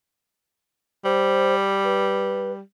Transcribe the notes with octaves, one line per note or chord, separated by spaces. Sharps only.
G3 C5
B4